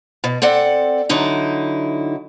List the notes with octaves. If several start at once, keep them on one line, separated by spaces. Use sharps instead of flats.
B2
C4 A4 D5 F#5
D3 F#3 D#4 E4